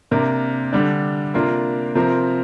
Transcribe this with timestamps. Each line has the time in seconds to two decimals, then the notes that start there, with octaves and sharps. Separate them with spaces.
0.11 C3 A#3 D4 A#4
0.73 D3 G3 D4
1.34 C3 A#3 D4 F4 A#4
1.95 C3 F3 C4 A#4